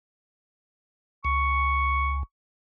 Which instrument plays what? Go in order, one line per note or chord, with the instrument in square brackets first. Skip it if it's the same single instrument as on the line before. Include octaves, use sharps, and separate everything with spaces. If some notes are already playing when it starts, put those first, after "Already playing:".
[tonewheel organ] C#2 [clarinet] C#6